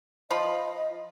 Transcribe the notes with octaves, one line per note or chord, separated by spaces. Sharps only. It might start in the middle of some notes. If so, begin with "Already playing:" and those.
F3 F4 D#5 B5